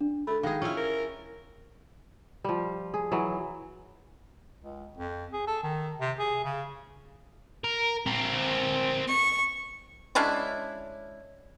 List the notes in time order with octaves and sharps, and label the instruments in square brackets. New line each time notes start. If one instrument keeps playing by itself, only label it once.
[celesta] D4
[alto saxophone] A3 [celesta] A4 B5
[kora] D#3 G#4 [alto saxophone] G#3 [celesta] F5
[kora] C#4 E4 [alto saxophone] F4
[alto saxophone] A#4
[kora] F3 G3
G#4
E3 F#3
[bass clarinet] C#2
F2
G#4
A4
D#3
C3
G#4
C#3
[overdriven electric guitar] A#4
C4 A#4
[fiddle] C#6
[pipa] G#3 C#4 D4 E4